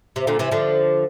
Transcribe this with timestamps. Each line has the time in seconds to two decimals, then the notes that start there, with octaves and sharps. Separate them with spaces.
0.16 C3
0.27 A#2 D3
0.39 C3 E3
0.51 D3 F3